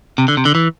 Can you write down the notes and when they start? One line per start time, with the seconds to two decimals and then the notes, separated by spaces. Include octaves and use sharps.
0.18 C3
0.28 D3
0.37 C3
0.45 D3
0.55 E3